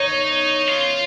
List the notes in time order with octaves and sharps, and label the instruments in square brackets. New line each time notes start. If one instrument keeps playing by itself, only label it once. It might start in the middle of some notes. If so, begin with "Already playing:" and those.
Already playing: [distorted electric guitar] D#4 [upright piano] C#5
[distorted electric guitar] F4